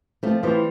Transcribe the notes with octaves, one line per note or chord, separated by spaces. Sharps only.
F3 A3 C4
E3 G3 F4 C5